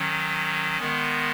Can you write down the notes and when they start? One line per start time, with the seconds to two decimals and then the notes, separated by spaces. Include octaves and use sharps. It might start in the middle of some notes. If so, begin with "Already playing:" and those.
Already playing: D#3 F#3 C#4
0.78 D#3 G#3 B3